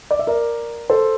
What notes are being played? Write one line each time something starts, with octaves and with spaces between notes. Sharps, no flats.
D5
E5
A#4 D5
A4 C5